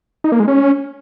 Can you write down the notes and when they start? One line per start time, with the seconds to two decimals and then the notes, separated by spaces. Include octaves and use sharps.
0.24 D#4
0.32 A#3
0.40 G#3
0.48 C#4